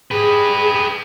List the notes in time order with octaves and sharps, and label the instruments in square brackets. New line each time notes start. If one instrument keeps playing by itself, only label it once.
[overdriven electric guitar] G4 B4 [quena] G#4